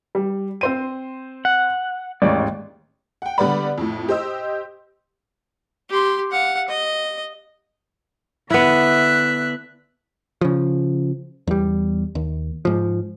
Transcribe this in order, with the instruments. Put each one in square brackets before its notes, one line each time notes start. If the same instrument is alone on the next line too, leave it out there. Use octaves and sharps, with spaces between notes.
[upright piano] G3
C4 C5 D#7
[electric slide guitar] F#5
[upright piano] A1 D#2 G#2 [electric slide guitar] D5
[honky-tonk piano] F#5 G5
D3 G3 B3 D5 B5
F2 A2
G4 C5 D#5 E6
[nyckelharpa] G4 C6
F5 F#5
D#5
[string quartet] D3 E5 F#6 [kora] B3 E4
[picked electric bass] C#3 F3
E2 G3
D#2
G#2 F3